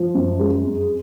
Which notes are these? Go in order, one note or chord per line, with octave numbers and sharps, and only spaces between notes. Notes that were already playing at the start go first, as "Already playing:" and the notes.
Already playing: F3
F#2
G#3
F2